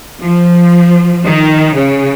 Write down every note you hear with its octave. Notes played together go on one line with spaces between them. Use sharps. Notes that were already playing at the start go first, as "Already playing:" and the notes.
F3
D#3
C#3